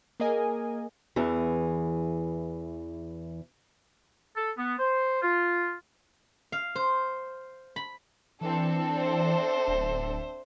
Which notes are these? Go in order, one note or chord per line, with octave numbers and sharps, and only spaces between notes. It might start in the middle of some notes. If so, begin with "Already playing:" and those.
A#3 G#4 A#4 D#5 G#5
E2 E3 G#4
A4
B3
C5
F4
F5
C5
B5
E3 C4 D4 A4
C5 E5
D1